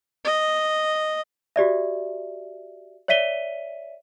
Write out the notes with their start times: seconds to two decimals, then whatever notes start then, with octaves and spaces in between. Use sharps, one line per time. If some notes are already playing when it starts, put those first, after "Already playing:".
0.24 D#5
1.56 F#4 G4 D5 E5
3.08 C#5 D5 E5 B6 D#7 G7